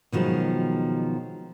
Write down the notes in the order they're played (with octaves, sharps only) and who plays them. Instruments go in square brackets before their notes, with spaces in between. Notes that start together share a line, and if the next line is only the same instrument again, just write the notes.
[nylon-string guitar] B2 D#3 F3 F#3 G#3